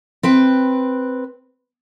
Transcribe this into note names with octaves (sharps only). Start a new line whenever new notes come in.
C4 B4 G5